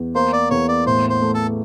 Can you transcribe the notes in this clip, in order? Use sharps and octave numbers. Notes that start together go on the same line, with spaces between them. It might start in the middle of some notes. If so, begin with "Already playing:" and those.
Already playing: E2
A#3 C5
D5
E2 C#5
D5
A2 C5
C5
A3
A4